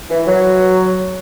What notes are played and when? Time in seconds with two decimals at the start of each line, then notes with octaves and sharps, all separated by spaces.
0.10 E3
0.27 F#3